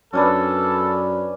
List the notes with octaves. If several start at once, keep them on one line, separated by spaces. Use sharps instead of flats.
F#2 C#4 D4 A4 B4